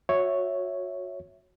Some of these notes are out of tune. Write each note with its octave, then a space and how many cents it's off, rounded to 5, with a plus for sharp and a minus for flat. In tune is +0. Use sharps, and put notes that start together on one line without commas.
F#4 -20 C#5 -5 E5 +0